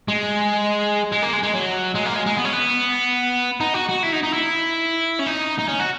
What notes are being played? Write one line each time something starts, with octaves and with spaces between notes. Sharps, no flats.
G#3
G#3
A#3
G#3
G#3
F#3
G#3
A#3
G#3
G#3
B3
C#4
B3
D#4
F#4
F#4
E4
D#4
D#4
E4
C#4
D#4
D#4
C#4
F#4